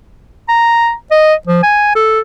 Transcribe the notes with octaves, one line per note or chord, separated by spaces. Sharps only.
A#5
D#5
F3
G#5
A4